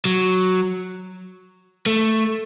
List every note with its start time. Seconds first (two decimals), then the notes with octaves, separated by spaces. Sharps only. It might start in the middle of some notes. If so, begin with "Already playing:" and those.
0.05 F#3
1.86 A3